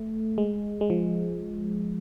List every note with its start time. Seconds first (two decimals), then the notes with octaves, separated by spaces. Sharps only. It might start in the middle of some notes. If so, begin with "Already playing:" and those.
Already playing: A3
0.38 G#3
0.81 G#3
0.90 F3